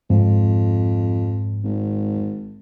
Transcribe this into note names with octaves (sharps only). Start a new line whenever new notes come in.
F2 G#2
G#1